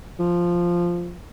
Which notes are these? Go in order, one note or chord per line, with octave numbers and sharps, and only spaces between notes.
F3